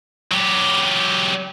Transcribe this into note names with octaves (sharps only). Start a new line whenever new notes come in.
F#3 G4